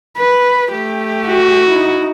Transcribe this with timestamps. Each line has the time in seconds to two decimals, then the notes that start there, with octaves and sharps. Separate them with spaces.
0.17 B4
0.72 A3 G4
1.27 F#4
1.68 D#4 E4